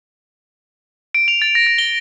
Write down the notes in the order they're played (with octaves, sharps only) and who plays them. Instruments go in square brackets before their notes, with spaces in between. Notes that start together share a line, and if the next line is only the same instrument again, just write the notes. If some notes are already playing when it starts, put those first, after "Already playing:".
[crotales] D7
F7
A6
A#6
A#6
G7